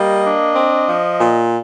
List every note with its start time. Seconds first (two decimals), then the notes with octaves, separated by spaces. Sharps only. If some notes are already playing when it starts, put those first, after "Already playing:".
Already playing: G3 A#3 D#5
0.25 D4
0.55 C4
0.87 F3
1.18 A#2